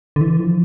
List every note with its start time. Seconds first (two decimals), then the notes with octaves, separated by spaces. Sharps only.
0.16 D3
0.21 E3
0.39 F3